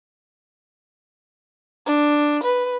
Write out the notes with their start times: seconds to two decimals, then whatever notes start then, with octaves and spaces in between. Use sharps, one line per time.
1.86 D4
2.43 B4